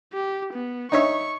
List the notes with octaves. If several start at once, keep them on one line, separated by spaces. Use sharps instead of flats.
G4
B3
D#4 C#5 E5 C#6